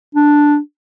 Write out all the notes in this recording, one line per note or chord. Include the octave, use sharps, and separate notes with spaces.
D4